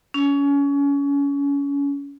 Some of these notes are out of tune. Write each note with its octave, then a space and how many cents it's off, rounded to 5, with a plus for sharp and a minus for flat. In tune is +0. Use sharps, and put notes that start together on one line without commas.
C#4 +30